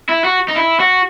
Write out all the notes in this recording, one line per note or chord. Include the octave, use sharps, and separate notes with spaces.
E4
F#4
D#4
E4
F#4